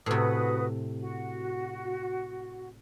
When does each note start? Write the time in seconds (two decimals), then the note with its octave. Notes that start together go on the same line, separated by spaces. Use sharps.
0.06 A2 C3 F#4 B4 D#6
1.00 F#4